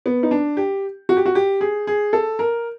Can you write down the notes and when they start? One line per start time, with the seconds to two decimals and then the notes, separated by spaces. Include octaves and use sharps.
0.06 B3
0.23 D#4
0.31 D4
0.57 G4
1.09 F#4
1.17 G4
1.26 F#4
1.35 G4
1.61 G#4
1.87 G#4
2.13 A4
2.39 A#4